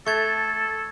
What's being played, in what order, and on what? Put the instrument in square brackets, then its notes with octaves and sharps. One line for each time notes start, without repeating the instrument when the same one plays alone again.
[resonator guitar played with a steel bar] A3 [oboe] A4 [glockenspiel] C#6 G#6 A6